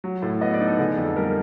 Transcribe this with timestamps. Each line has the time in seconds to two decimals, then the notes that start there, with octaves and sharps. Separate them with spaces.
0.04 F#3
0.22 A2
0.41 B3 D#5
0.54 D5
0.60 D#4
0.66 A4
0.78 D3 G#4
0.97 F2 A4
1.16 G3 A#4